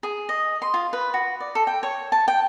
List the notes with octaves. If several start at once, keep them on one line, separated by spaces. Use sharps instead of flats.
G#4
D#5
C6
F4
B4
F#4
D5
A4
G5
C#5
A5
G5